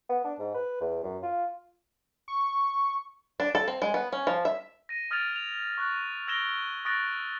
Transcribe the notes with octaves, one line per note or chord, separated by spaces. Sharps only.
B3
D4
G#2
B4
E2
F#2
F4
C#6
D4
A4
C4
G#3
B3
C#4
F3
E5
A#6 D#7
D#6 F6 G#6 A6 D7 F7
F7
C#6 F#6 A6
E6 G#6 A#6 D7 E7 G7
C#6 D#6 F#6 A6 A#6 D7